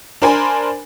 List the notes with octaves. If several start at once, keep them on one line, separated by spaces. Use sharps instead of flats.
D4 A#4 C5 G#5 B5